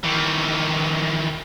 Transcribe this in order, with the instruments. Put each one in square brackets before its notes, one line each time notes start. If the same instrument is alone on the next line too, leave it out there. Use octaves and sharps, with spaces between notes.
[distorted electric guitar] D#3 E3